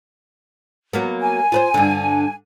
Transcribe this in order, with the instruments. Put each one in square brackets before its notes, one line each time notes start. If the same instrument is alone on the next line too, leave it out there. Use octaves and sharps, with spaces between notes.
[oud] F#3 A#3 B3
[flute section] G#5
[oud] F4 B4 C5
G2 D3